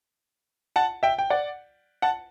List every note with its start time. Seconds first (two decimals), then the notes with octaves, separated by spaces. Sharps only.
0.76 F#5 A5
1.03 E5 G5
1.19 G5
1.30 D5 F#5
2.02 F#5 A5